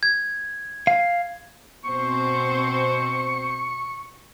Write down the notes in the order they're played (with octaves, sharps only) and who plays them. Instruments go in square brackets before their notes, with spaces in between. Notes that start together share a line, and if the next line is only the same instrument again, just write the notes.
[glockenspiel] G#6
[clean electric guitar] F5
[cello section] B2 C4 C5 [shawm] C#6